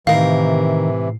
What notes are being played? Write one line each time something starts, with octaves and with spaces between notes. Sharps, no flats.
A2 C3 D#3 E3 A#4 F5 C7